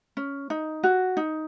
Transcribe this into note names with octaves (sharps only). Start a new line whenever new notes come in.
C#4
D#4
F#4
D#4